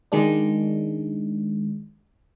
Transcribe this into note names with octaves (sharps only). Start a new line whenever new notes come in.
D#3 G#3 D4